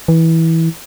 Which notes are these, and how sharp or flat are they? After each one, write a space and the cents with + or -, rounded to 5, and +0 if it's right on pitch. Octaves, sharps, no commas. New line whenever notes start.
E3 -15